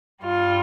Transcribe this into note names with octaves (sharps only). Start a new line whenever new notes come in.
G2 G3 F4